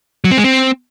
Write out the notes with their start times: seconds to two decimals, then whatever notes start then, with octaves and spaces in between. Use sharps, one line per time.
0.24 F#3
0.31 C4
0.38 G#3
0.44 C4